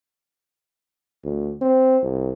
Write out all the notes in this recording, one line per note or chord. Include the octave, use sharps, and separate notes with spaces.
D2
C4
C2